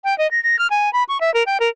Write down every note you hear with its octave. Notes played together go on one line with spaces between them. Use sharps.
G5
D#5
A#6
A#6
F6
G#5
B5
C#6
E5
A#4
G5
A#4